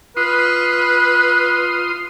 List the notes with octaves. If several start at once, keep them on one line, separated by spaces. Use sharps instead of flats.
F4 B4 C6 D#6